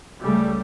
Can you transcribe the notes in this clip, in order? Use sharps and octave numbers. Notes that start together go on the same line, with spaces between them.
C#2 C#3 G3 A3